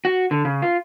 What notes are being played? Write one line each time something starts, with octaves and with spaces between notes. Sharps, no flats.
F#4
D3
C#3
F4